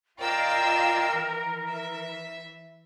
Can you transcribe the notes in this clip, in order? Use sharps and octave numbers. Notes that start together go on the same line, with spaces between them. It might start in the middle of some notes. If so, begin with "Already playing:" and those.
F4 A#4 D5 D#5 F5 G5 E6
E3
E5